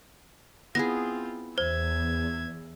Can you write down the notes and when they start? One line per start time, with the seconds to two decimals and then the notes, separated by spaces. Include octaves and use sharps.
0.75 B3 C4 E4 F4 G#4 A#6
1.58 E2 C5 E5 G#6